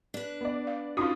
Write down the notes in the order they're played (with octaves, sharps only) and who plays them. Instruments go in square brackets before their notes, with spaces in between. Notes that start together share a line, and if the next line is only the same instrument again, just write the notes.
[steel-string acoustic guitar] D4 B4
[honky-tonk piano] B3 D5
[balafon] F5
[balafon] C#4 D#4 F#4 [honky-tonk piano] F4 D#6